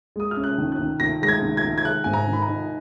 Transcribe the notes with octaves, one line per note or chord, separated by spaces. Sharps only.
G#3 D#6
F6
C#4
F#6
D#3
F#6
D#3
D#3 A#6
G#3 A#6
G#6
D#3
G#6
D#3
G#6
G#3 F#6
G#2 G#5
A#5
D#3
B5
A#5
D#4